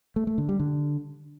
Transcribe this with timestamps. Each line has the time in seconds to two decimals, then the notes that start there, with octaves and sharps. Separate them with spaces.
0.16 A3
0.27 A3
0.38 D3
0.49 G3
0.60 D3